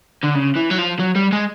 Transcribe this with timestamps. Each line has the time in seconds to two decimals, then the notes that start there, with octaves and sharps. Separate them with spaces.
0.23 D3
0.35 C#3
0.56 E3
0.70 F#3
0.78 F3
0.99 F#3
1.15 G3
1.32 G#3